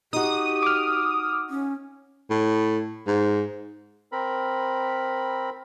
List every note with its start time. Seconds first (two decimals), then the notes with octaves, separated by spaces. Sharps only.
0.13 D#4 F#4 G4 D#6
0.63 D6 F6
1.50 C#4
2.30 A2
3.07 G#2
4.12 C4 A#4 B5